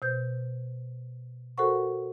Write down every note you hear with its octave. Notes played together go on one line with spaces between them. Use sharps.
B2 C5 G6
F#4 A4 A#4 C5 F#5 C#6